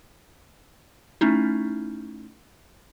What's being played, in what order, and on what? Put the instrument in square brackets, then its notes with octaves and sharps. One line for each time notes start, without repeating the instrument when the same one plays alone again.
[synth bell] A3 C#4 D#4 E4